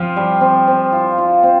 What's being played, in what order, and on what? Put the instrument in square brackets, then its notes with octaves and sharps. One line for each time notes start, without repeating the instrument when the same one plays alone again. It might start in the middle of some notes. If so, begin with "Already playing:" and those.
Already playing: [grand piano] F3 F4 [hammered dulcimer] C4
[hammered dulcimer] G3
C4
C4
F4
F4
C4